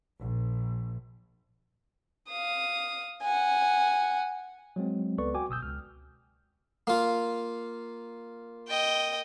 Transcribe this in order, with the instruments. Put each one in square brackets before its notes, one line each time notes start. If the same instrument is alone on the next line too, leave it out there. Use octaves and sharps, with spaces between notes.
[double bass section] A#1
[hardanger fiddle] F5 D#6
F#5 G#5
[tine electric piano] F#3 G#3 C4
C#2 B3 A4 B4 D5 C#6
F#4 G5 G#5 D6
G1 B2 D#6 E6 G6
C#2 F6
[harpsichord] A#3 F4
[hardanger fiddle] D#5 G5